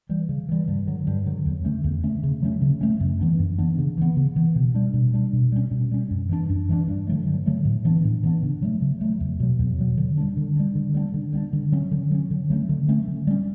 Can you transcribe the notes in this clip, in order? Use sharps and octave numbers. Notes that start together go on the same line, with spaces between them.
E3 G3
C#3
E3 G3
G2
D3 F#3
G2
D3 F#3
E2
D3 A3 C#4
E2
D3 A3 C#4
C#3
F#3 A3 C#4
C#3
F#3 A3 C#4
F#2
E3 B3 D4
F#2
E3 B3 D4
C#3
E3 B3
C#3
E3 B3
B2
G3 D4
B2
G3 D4
B2
G3 C#4
B2
G3 C#4
F#2
E3 A3 D4
F#2
E3 A3 D4
G2
D3 F#3 A3
G2
D3 F#3 A3
A2
E3 B3 D4
A2
E3 B3 D4
C#3
F#3 A3
C#3
F#3 A3
E2
B2 F#3
E2
B2 F#3
D3
G3 D4
D3
G3 D4
D3
G3 B3 D4
D3
G3 B3 D4
D3
F#3 C#4
D3
F#3 C#4
D3
F#3 A3 C#4
D3
F#3 A3 C#4
D3
G3 C#4